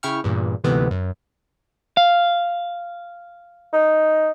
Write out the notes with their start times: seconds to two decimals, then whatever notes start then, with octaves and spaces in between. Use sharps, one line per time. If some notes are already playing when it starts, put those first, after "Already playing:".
0.03 C#3 E4 G5 C#6 F6
0.24 E2 G2 A#2
0.64 D2 G#2 C3 E3 B3
0.91 F#2
1.97 F5
3.73 D#4